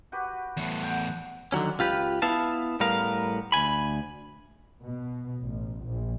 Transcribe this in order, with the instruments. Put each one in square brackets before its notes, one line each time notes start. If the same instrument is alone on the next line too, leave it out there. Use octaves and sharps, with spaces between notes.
[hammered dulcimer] F#4 G4 B4
[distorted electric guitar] E2 A2
[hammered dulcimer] F#5 G5
[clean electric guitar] D3 D#3 F#3 C#4
C#2 F4 G4 B4
B3 E4 F5 A5
A2 G3 B3 A#4 F5
D2 G2 G#5 B5
[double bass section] B2
A1
A#1